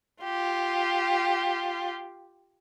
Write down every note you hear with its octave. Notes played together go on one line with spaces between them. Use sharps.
F4 G4